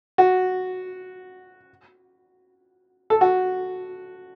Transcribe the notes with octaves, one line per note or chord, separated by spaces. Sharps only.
F#4
A4
F#4